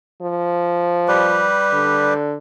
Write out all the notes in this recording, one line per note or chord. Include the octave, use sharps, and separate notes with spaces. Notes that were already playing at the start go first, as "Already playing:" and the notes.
F3
G3 G4 B4
D3